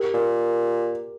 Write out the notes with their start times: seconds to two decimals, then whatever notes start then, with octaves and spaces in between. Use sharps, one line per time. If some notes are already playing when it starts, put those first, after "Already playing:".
Already playing: G4 A#4
0.14 A#2